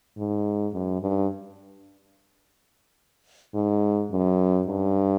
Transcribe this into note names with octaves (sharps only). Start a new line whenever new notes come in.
G#2
F#2
G2
G#2
F#2
G2